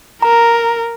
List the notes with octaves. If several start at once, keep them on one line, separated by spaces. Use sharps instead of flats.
A#4 A#5